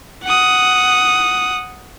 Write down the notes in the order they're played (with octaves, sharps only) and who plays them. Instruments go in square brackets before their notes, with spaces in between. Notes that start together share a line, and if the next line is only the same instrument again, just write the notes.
[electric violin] F#5 D#6